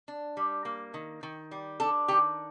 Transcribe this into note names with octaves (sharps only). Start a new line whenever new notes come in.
D4
G3
A#3
D#3
D#3
G3
D4 A4
D#3 G4